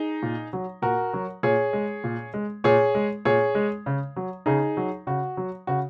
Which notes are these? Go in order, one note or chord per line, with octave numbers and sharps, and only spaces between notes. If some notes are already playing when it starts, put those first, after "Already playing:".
Already playing: D#4 G#4
A#2
F#3
A#2 F#4 A#4
F#3
A#2 G#4 C#5
G#3
A#2
G#3
A#2 G#4 C#5
G#3
A#2 G#4 C#5
G#3
C#3
F#3
C#3 D#4 G#4
F#3
C#3 F#4
F#3
C#3 F#4